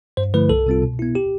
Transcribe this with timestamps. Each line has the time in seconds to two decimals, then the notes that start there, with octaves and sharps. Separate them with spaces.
0.17 G2 C5
0.34 D3 F3 A3 E4 B4
0.49 C2 A4
0.66 C3 G3 C4 F4
0.82 B2
0.99 B3 E4
1.15 G4